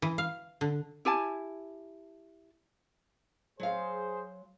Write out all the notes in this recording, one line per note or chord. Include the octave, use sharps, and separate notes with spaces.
E3
F5
D3
E4 G4 G#5 A5
F#3 G#4 C5 F5